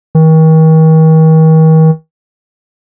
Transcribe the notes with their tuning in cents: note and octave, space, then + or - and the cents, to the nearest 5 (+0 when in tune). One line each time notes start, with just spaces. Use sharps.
D#3 +40